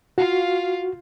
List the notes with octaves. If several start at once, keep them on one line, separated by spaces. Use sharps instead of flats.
F4 F#4 F5